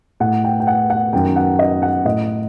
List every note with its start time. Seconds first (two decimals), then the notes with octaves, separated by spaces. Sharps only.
0.20 A2 F#5
0.44 G5
0.60 G5
0.67 F#5
0.90 F#5
1.13 F#2 D#3 G5
1.36 F#5
1.59 D#5
1.82 F#5
2.05 A2 D#5